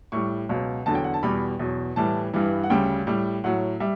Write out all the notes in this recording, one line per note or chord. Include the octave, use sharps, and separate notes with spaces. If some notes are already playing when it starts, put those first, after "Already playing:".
A2 G3 C#6
C#2 B2 F#3
E2 D3 F#3 A5
G5
F#5
A5
E2 B2 G3 B5
E2 B2 F#3
A2 E3 G3 A5
G2 E3 G3
F#5
D2 C#3 G3 G5
A2 G3
A2 F#3 F#5
G3 E5